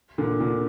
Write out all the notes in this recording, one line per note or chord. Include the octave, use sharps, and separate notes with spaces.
A#2 D3
A#2 D3